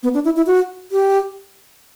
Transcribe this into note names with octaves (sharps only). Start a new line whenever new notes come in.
B3
D4
E4
E4
F#4
G4